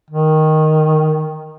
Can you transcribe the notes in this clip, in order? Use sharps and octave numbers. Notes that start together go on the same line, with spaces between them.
D#3